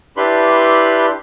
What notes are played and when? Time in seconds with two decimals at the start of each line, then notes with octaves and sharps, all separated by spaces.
0.17 D4 E4 G4 B4 B5 C6